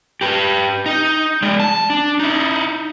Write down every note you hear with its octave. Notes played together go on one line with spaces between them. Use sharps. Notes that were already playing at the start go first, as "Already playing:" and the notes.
G4 B4
D#4
G#3 D5
A5
D4
D#4 E4